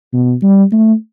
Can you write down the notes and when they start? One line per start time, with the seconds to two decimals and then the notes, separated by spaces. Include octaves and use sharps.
0.13 B2
0.42 G3
0.72 A3